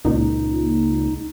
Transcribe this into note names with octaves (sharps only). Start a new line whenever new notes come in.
C#2 A#2 D#4